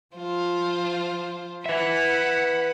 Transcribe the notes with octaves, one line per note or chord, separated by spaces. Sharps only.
F3 F4 C5
B4 E5 F#5 B5